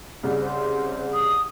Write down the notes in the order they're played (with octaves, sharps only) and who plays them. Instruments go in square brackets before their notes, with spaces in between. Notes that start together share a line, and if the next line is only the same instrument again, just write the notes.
[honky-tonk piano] C2 C#3
[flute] C5
D#6